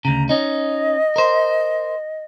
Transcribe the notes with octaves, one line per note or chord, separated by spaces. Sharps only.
D2 C#3 A#5
C#4 D#4 D#5
A#4 C5